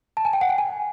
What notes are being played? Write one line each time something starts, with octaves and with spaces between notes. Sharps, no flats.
A5
G#5
G5
F#5
G5
G#5